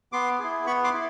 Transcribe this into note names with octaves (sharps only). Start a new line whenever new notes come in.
B3 C6 D6
E4 G#4
B3 B5 C#6
C6 D6
E4